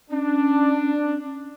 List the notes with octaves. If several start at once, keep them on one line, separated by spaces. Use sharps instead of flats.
C#4 D4